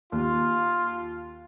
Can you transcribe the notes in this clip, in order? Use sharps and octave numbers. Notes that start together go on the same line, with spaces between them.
D#2 F4